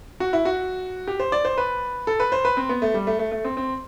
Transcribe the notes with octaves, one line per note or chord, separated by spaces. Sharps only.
F#4
E4
F#4
G4
C5
D5
C5
B4
A4
B4
C5
B4
C4
B3
A3
G3
A3
A3
A3
C4
C4